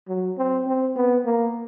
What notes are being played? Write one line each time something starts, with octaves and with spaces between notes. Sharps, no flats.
F#3
C4
C4
B3
A#3